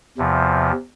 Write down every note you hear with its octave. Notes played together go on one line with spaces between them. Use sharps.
E2 C3 F3